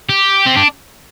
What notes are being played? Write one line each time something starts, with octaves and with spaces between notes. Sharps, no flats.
G4
C4
D4